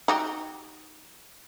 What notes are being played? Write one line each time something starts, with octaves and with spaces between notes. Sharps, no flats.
D#4 F#4 G4